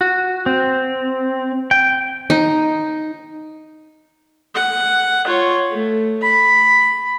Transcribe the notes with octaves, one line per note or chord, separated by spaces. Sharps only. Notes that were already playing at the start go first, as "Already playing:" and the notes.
F#4
C4
G5
D#4
F#5
F4 C#5
A3
B5